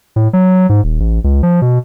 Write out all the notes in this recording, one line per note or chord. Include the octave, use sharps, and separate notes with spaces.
A2
F#3
G#2
D#1
A1
C#2
F3
B2